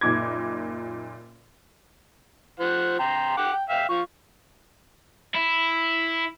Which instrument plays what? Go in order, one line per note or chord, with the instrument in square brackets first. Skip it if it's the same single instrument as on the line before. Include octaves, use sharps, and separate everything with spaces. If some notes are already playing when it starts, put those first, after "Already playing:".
[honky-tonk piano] F#1 A#2 D#4 D6 G#6
[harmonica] F3 C5 F#5
G5 A#5 C6
F#5 G5 D6
G5
E5 F5 G5
F3 F4 C#6
[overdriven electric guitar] E4